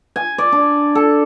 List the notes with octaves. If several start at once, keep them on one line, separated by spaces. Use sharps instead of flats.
G#5
D5
D4
A4